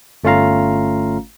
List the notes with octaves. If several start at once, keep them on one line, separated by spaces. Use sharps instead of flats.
G1 A3 C#4 F4 F5 A#5